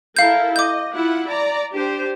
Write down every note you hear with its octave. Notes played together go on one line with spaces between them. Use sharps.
E4 A4 A#4 F5 G6
D#5 D6 G6
E4 F4 F#5
D5 A#5
D4 G4 C5